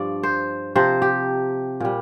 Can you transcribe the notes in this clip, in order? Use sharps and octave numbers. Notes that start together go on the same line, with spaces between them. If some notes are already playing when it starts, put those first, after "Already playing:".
Already playing: G2 F3 D5
C5
C3 F3 C5
G4
A#2 G3